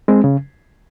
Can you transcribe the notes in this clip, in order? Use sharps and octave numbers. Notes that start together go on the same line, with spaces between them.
G#3 C4
C#3